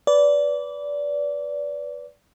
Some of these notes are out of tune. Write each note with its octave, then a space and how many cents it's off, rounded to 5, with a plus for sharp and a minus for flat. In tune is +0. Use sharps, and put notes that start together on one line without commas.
B4 +0 D5 -20